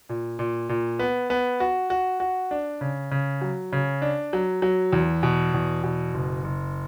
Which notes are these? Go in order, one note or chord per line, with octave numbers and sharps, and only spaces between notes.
A#2
A#2
A#2
B3
B3
F#4
F#4
F#4
D4
C#3
C#3
F#3
C#3
D4
F#3
F#3
E2
B2
E2
B2
F#1
F#1